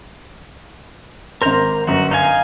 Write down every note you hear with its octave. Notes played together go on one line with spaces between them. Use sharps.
G#1 A#4 C5 A#5 C6
G1 F#2 F#4
D#4 F5 G#5